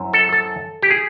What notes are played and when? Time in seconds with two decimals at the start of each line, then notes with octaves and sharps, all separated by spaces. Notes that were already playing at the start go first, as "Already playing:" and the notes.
Already playing: F#2 C4 E4
0.13 A4
0.33 A4
0.83 G4
0.90 G#4